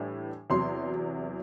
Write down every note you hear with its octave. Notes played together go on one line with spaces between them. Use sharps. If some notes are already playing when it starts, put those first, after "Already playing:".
Already playing: A2 E3 G3 D4
E2 C3 F#3 C6